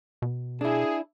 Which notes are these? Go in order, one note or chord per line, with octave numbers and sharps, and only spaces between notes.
B2
D4 E4 G#4